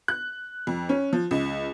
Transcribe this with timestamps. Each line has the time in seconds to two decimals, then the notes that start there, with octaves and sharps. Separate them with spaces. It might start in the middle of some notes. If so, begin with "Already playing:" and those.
0.08 F#6
0.67 F2
0.89 C#4
1.13 F3
1.31 C#2